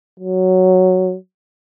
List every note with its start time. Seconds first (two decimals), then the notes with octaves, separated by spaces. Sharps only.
0.20 F#3